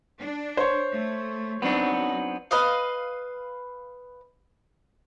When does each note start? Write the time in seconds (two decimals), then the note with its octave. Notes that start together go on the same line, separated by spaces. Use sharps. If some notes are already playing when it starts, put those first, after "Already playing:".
0.19 D4
0.57 C5 C#5
0.93 A3
1.62 F#3 B3 C4 D4 D#4
2.51 B4 D#5 F5